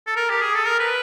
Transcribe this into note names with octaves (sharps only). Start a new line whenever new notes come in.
A4
A#4
G4
G#4
A4
A#4
B4